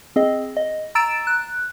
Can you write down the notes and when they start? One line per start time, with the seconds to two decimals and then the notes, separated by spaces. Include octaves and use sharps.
0.16 C4 G#4 D#5
0.57 D#5
0.95 A#5 E6 A6 D7 E7
1.27 F#6